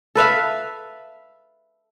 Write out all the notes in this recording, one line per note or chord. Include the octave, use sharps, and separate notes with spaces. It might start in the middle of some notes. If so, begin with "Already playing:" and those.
A4 B4 E5 F5